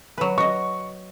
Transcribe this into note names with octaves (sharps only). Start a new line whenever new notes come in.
F#3 B4
F#4 D#5 C#6